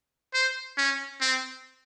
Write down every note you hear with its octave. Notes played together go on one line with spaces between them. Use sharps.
C5
C#4
C4